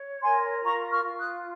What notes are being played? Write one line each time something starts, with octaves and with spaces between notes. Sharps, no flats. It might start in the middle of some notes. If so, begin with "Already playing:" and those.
Already playing: C#5
A#4 G#5 C6
F4 A#5 C#6
C#6 F6
F4
D#6 F#6